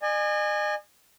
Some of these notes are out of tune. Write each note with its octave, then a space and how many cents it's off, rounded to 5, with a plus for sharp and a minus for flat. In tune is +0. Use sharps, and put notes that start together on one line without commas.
D#5 -45 G#5 -10